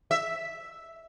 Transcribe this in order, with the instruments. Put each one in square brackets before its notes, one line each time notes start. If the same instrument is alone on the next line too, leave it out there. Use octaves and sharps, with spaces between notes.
[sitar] E5